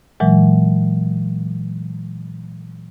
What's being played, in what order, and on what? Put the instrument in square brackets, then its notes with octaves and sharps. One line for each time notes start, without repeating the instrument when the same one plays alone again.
[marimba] A#2 E3 F#3 G#3